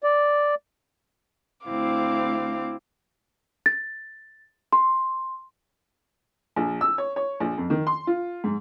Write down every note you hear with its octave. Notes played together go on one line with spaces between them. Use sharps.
D5
D2 C4 E4 F5 D6
A6
C6
A#1
E6
C#5
C#5
A#1
F2
D#3
C6
F4
G#2